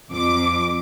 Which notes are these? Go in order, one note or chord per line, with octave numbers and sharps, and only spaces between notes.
F2 D6